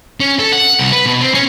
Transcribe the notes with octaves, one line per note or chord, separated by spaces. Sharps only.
C#4
A4
F#5
C2
B4
B2
C4
C#4